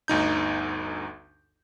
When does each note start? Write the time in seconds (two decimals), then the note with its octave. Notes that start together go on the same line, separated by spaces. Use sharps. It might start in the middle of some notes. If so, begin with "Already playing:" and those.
0.08 G1 D2 D#4 G6